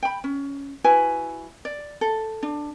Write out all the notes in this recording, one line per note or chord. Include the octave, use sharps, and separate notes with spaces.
G5 B5
C#4
E4 F#4 B4 G#5
D5
A4
D4